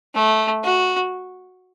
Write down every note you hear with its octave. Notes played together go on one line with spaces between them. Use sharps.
A3
F#4